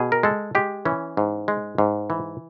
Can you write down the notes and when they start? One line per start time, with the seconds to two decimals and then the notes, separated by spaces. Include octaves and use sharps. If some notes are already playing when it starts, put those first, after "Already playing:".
Already playing: B2 G#4
0.12 A#4
0.23 G#3 A4
0.55 G#3 G4
0.85 E3 C#4
1.17 G#2
1.48 G#3
1.78 G#2
2.10 E3